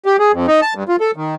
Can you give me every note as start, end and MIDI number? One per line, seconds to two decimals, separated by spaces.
0.06 0.17 67
0.20 0.32 68
0.33 0.46 41
0.48 0.60 63
0.62 0.74 81
0.75 0.84 43
0.89 0.96 65
1.01 1.11 69
1.16 1.35 51